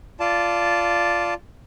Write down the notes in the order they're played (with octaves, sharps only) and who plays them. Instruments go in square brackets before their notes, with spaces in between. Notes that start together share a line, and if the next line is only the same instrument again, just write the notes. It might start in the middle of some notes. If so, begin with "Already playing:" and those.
[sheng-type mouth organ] F4 D5 A5